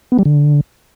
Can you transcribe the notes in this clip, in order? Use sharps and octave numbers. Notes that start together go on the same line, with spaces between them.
B3
G3
D3